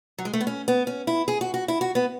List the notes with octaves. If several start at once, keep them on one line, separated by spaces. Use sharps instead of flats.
F#3
G#3
A3
B3
C#4
B3
C#4
E4
G#4
F#4
F#4
E4
F#4
B3